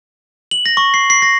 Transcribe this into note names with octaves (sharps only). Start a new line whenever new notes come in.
F#7
A#6
C#6
C7
C7
A#6